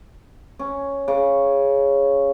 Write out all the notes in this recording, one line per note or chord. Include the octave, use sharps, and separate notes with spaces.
C#4
C#3